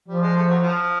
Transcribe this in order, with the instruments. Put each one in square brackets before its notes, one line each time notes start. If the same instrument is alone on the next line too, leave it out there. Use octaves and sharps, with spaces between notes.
[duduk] F3 [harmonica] G3
[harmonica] G#3
A3
F#3
F3